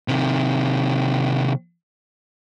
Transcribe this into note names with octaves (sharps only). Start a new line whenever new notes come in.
C3 D#3